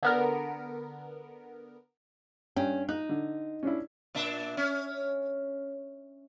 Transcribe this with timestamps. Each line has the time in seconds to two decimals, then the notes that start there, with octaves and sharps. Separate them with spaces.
0.03 D3 B3 A#4
2.56 G2 C#4 G5
2.89 D#4 F#6
3.09 D3
3.63 C#4 D4 E4
4.15 A#2 D4 E5
4.57 C#4